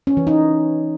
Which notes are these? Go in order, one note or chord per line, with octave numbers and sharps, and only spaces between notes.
C#4
E3
D#4